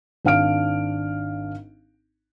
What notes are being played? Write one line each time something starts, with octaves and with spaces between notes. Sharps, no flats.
G#1 D4 F5 F6 D7